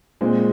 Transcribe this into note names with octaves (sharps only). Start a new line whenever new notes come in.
A#2 G#3 C4